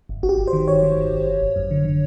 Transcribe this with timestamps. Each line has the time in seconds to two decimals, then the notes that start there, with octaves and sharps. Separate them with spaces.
0.09 G1
0.23 G1 F#4
0.29 G4
0.38 G1
0.47 C5
0.53 D#3
0.68 G1 C#5
0.83 D#3
0.97 G1
1.12 G1
1.27 G1
1.42 G1
1.56 F#2
1.71 D3
1.85 D3